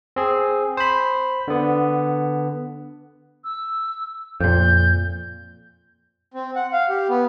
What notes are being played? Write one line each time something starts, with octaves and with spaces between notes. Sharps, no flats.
C4 G#4
C5 B5
D3 B3
E6
F2 A#2 G6
C4
F#5
F5
G4
B3